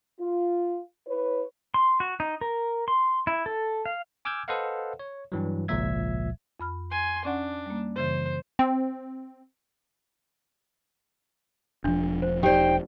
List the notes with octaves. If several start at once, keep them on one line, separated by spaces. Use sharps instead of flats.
F4
E4 B4 C#5
C6
F#4
D#4
A#4
C6
E4
A4
F5
G#5 D6 E6 F6 G6 G#6
A4 B4 C5 D#5 F5 F#5
C#5
G2 E3 F#3
G#1 C#2 A#2 F3 E5 G#6
F2 B5 F6
G#5 C6
C#4 D4 D5 F#5
G3 A#3
F#2 C#3 E3 C5
C4
E1 F3 D4
C5
D#4 G4 C5 D5 G5